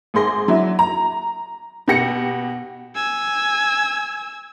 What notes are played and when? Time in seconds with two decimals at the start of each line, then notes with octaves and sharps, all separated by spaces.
0.14 G#1 G#4 C6 A#6
0.48 F#3 D4 E4
0.79 A#5
1.88 B2 G4 A#6 C#7
2.95 G#5 E6